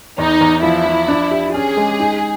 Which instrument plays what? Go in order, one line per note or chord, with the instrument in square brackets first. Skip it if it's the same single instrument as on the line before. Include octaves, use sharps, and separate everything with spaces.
[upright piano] E2 [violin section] D#4
[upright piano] E2
[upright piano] F3 [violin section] E4
[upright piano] F3
D4
G4
[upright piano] C#4 [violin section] G#4
[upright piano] G#3
D#4